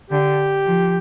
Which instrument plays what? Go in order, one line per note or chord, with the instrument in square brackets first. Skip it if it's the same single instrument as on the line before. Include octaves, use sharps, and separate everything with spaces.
[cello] D3 [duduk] G4
[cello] F3